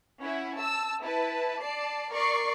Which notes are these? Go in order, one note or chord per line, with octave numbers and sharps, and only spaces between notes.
C#4 E4 F#5
A5 E6
E4 B4 A5
D5 A5 C7
A#4 D5 C#6 C7